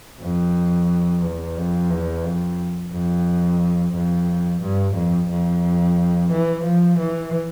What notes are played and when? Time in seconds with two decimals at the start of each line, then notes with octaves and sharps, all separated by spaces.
0.21 F2
1.22 E2
1.57 F2
1.90 E2
2.25 F2
2.92 F2
3.93 F2
4.61 G2
4.95 F2
5.29 F2
6.31 E3
6.64 F3
6.98 E3